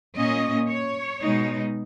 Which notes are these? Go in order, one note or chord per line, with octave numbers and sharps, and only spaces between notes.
A#2 A#3 C#4 D#5
C#5
B2 G#3 D#4